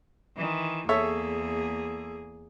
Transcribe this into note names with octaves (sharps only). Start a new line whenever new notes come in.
D#3 E3
E2 A#3 G#4 A4 C#5 E5